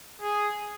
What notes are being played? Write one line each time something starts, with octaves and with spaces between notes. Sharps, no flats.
G#4